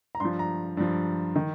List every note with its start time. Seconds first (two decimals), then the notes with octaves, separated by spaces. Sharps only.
0.15 A#5
0.20 G2 F3 C6
0.39 A#5
0.77 G2 F3
1.36 D#3